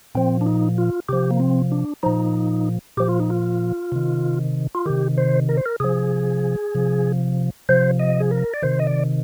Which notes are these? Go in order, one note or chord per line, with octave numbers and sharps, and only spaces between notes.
A#2 F3 C4
D4
D#4
F4
C3 F3 G4
A#3
C4
D4
A#2 F3 D#4
A#2 F3 G4
F4
D#4
F4
C3 D#3
F4
C3 D#3 G4
C5
A#4
C5
A#4
C3 F3 G#4
C3 F3
C3 F3 C5
D#5
G#4
A#4
D5
C3 D#3 C5
D#5
D5